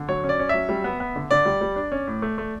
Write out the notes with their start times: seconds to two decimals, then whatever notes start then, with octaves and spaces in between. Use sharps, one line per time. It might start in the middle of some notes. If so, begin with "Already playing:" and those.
Already playing: D3
0.08 F#3 C#5
0.24 C#4
0.29 D5
0.39 C#4
0.49 F#3 E5
0.69 G3
0.84 B3
1.00 B3
1.16 D3
1.31 D3 D5
1.45 G3
1.61 G3
1.76 D4
1.92 C#4
2.07 A2
2.22 A3
2.38 A3